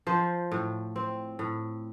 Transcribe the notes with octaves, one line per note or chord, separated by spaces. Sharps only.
F3 C5
A2
C4
A2